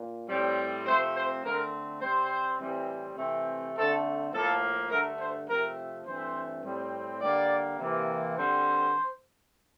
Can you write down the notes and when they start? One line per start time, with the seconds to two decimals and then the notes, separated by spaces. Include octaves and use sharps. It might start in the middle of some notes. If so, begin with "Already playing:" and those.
Already playing: A#2
0.29 A2 G3 C4
0.86 C3 F3 A3 C4 C5
1.15 C5
1.44 D3 A3 C4 A#4
2.01 C3 G3 C4 C5
2.59 A2 E3 G3 C4
3.17 C3 E3 A3 C4
3.75 D3 A3 C4 A4
4.32 A2 F3 A#3 A4
4.90 G2 D3 A3 A#4
5.19 C5
5.48 C3 F3 A3 C4 A#4
6.05 G2 E3 A3 C4 C5
6.63 A2 G3 C4
7.21 D3 G3 A#3 D5
7.79 C3 E3 A#3
8.36 G2 D3 G3 C4 C5